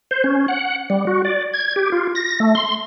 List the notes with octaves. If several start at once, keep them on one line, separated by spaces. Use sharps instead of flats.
C5
C#4
F#5
G3
F#4
D5
G#6
G4
F4
A#6
A3
C6